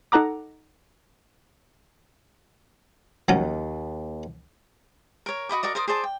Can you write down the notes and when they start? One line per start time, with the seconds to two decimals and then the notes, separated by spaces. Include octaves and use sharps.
0.12 D#4 A4 F#5 A#5 D6
3.28 D#2 F3 F#3 C#4
5.26 A#4 C#5
5.49 F#4 D#5 B5 D6
5.63 F#4 A#4 D5 D#5
5.75 A#4 C5 D5 D#6
5.88 G#4 C5 D5 A5
6.04 G5